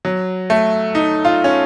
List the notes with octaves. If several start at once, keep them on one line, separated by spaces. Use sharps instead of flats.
F#3
A3
D#4
F4
C#4